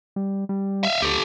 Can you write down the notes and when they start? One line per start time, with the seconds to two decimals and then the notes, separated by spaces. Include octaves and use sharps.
0.16 G3
0.49 G3
0.83 E5 F5
1.02 D2 G4 A4